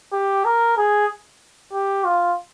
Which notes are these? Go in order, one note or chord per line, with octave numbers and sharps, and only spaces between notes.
G4
A#4
G#4
G4
F4